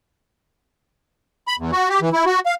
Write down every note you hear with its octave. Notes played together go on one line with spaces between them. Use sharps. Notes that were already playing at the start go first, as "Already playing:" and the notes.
B5
E2
F#4
G4
E3
E4
F#4
F5